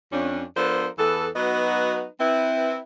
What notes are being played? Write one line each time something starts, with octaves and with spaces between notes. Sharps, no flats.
F2 C#4 D4
F3 B3 D4 A4 A#4 C5
E2 E3 B3 A4
F#3 B3 D#4 F#4 B4 D#5
C4 E4 B4